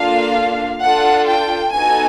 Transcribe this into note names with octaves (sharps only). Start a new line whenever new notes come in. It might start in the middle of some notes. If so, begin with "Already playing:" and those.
Already playing: A#3 D4 F4 A4 F5
D4 F4 A4 F#5
G5
B3 D#4 F#4 A4 G#5